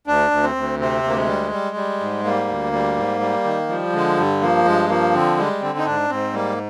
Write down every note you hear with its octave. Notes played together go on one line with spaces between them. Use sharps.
D2 D4
D2
C4
D2
C3 C4
D2 A#3
G#3
G3
G3
G3
G#2
G3 A#3
D2
G3
G#2
G3
D#3
F3 G3
D3 G#3
G2 G3
F3 A#3
G2 G#3
F3 A#3
D3 C4
G3 G#3
D3 C4
D#4
G#2 D4
G#2 C4
G3 A#3